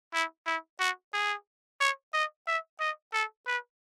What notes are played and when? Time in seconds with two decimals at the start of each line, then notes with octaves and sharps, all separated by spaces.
0.14 E4
0.46 E4
0.80 F#4
1.14 G#4
1.81 C#5
2.14 D#5
2.47 E5
2.80 D#5
3.14 A4
3.47 B4